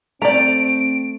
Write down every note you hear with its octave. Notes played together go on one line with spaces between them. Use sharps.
A3 C4 D5 G5 A#5 D7